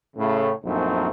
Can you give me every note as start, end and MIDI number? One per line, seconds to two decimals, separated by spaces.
0.17 0.51 45
0.17 0.51 49
0.65 1.10 34
0.65 1.10 42
0.65 1.10 57
0.65 1.10 60
0.65 1.10 63